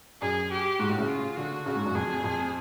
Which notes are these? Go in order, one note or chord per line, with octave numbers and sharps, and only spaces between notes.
F#2 G#4
G4
G#2 F#4
A2
C#3
F4
D3 F#4
C#3 F#4
G#2
F#2
F2 G#4
F2